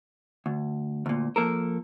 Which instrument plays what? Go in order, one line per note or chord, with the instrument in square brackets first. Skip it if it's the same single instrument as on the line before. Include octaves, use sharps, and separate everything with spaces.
[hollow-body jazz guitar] D2
D2 A#2
F3 A#3 A4 A#4